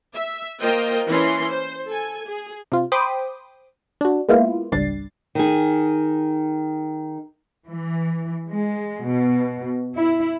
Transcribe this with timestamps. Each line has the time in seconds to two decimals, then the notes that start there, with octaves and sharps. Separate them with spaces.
0.15 E5
0.61 A#3 F4 A#4 C5 D#5 G5
1.08 E3 C#4 C6
1.51 C5
1.88 A4 G#5
2.28 G#4
2.72 C3 F4
2.92 C5 G5 B5 C6 D6 D#6
4.01 D4 F#4
4.28 G#3 A#3 B3 E4 F4
4.72 G#1 C#2 G3 D4 A6 C7
5.35 D#3 G#4
7.68 E3
8.49 G#3
9.04 B2
9.94 E4